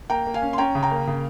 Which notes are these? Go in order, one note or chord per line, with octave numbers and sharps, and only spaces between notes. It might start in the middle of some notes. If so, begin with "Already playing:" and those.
A#3 G5 A#5
A#3
F5 G#5
C#4
C6
C#4 G5 A#5
C#3
G5 A#5
A#3
C#3